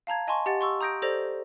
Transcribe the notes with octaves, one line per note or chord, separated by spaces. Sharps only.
F5 A5 A#5 G#6
D#5 G#5 A5 C6 C#6
G4 D#5 F#5 A6
C6 C#6 E6
A#5 D#6 G6 A#6 D7
G4 A4 C5 D5 A#6 F7